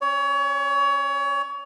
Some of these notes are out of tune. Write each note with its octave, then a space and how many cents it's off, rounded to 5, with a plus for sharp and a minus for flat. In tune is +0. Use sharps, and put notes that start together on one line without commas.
C#4 -30 C#5 +30